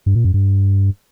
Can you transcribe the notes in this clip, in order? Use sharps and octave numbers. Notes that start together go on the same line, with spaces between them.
G2
A#2
F#2
G2